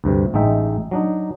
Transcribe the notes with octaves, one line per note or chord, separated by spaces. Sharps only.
D2 G2 C3
A1 G#3 D#4 E5 G5
F#3 D4 D#4